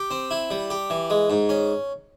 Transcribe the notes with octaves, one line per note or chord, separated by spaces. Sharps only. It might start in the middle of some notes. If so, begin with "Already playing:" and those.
Already playing: G4
C4
E4
G3
G4
E3
G#3
G#2
C#4